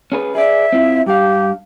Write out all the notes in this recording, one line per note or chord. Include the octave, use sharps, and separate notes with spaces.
C#4 G#4 B4
G#4 B4 D5 E5
C4 E4 F4
G2 G4 F5